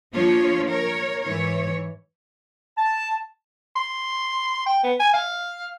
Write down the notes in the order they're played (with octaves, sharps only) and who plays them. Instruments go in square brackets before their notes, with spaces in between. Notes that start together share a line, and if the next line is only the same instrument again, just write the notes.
[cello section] F3 A#3 D4 F4 C#5
A#4 C#5
G#2 E3 C#5
[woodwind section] A5
[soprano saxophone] C6
G5
B3
G#5
F5